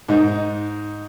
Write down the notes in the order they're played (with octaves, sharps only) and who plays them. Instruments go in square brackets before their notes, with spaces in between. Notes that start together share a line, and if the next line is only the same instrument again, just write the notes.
[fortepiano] G#2 D#4